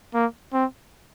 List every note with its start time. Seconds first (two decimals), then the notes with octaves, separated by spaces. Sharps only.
0.14 A#3
0.53 C4